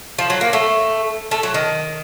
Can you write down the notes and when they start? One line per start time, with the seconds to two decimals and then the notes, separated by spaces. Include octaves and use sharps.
0.18 F3
0.30 F#3
0.41 A#3
0.53 A3
1.31 A3
1.43 F#3
1.54 D#3